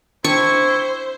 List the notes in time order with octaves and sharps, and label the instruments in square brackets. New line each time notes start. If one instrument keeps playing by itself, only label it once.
[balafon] D4 G5 [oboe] E4 [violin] C5 [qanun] C#6